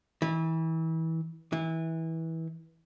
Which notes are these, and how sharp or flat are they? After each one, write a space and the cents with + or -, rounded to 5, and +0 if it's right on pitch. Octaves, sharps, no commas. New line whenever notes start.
E3 -30
E3 -20